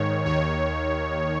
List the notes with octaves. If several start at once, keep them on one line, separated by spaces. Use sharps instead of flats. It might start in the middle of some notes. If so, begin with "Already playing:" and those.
Already playing: G#2 D#3 C#5
D#2 D#3 C#5